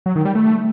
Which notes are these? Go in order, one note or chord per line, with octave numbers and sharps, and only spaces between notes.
F#3
D#3
G3
A3